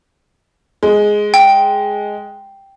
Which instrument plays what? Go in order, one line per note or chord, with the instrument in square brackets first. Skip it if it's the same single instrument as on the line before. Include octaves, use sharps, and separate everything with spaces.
[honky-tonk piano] G#3
[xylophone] G5